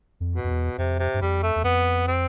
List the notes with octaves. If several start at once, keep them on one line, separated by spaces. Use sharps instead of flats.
F2
B2
F2
E2
F2 C3
C3
G2
F2 G3
A3
E2
F2 B3
C4